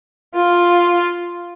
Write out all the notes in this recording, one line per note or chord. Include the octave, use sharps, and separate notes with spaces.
F4